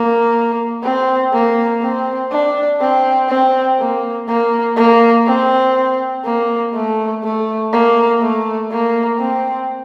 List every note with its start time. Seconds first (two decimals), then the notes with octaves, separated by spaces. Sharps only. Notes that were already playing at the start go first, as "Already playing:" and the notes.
Already playing: A#3
0.83 C4
1.33 A#3
1.82 C4
2.31 D4
2.80 C4
3.29 C4
3.79 A#3
4.28 A#3
4.77 A#3
5.26 C4
6.25 A#3
6.74 A3
7.23 A3
7.72 A#3
8.21 A3
8.71 A#3
9.20 C4